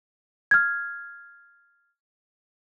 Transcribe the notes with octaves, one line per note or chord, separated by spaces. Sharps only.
F6 G#6